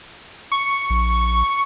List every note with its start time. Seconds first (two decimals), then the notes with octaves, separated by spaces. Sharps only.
0.52 C#6
0.90 A#1